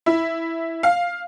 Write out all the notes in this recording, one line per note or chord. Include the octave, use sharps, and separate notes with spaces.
E4
F5